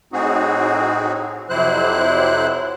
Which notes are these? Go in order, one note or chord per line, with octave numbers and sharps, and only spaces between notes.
A2 C4 D#4 F#4 G#4
F2 C3 F#3 E4 C5 F#6